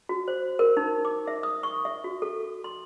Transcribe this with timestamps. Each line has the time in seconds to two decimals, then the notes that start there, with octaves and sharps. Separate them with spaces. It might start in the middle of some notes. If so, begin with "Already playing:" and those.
0.09 F#4
0.28 C5
0.59 A#4
0.77 D#4
1.05 D6
1.27 E5
1.43 D#6
1.63 C#6
1.85 E5
2.04 F#4
2.22 A4
2.64 C6